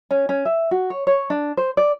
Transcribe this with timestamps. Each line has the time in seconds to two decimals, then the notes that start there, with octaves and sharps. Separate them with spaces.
0.11 C#4
0.29 C#4
0.45 E5
0.71 F#4
0.90 C#5
1.07 C#5
1.30 D4
1.57 C5
1.77 D5